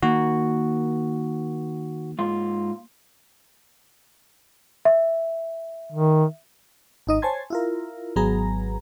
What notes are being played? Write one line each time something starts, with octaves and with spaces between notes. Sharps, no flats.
D#3 A#3 F#4
G#2 F4
E5
D#3
G#1 D#4 D#5
C5 C#5 G#5 A5 C6 G#6
E4 F4 A#4
G#1 F#3 B3 G#4 A#5